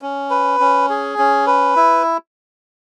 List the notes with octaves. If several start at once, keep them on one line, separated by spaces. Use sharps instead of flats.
C#4
B4
C#4
G#4
C#4
B4
E4